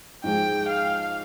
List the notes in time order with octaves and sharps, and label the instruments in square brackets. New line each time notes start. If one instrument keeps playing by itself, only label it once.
[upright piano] G#2 F3 G#3 [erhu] G5
[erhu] F5